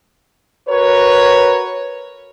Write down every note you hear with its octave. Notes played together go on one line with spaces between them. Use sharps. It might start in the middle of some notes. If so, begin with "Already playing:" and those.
F#4 A#4 B4 C#5